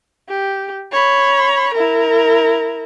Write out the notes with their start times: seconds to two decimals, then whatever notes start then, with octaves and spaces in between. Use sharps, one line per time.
0.29 G4
0.92 C#5 B5
1.74 E4 A#4